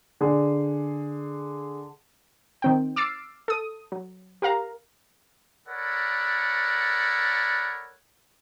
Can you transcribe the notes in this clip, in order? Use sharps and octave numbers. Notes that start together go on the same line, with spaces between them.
D3 G#4
D#3 C4 G5
D6 E6 F6 A6 C7 D7
A4 D#6
F#3
G4 A#4 F5 A#5
A4 A#4 C#5 D5 F#5 B5